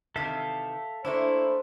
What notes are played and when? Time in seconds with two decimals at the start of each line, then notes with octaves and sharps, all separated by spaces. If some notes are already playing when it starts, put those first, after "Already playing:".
0.16 C3 D#3 E3 A4 E5 F5
1.05 A3 A#3 D4 E4 C5